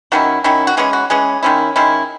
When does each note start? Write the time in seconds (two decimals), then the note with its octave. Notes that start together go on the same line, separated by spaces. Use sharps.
0.12 D#3 F#3 C#4 E4 F#4
0.44 D#3 F#3 C#4 E4
0.67 F#4
0.77 E3 G#3 C#4 G#4
0.93 F#4
1.10 E3 G#3 C#4 G#4
1.43 D#3 G#3 C#4 E4
1.76 D#3 G#3 C#4 E4